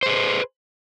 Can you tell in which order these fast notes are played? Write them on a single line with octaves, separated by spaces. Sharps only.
C5 G#4 B4